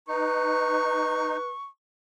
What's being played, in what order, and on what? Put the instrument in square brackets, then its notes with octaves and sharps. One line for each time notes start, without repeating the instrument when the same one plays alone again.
[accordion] D#4 [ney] B4 [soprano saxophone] C#6